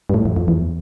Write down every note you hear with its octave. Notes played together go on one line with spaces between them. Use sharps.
G2
A2
F2
F2
E2